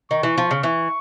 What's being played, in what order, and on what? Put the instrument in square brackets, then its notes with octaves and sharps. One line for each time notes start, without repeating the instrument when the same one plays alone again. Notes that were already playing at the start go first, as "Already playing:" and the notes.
[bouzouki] D#3 [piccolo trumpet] C#6
[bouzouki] E3
F3
C#3
[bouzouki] E3 [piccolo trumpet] C#6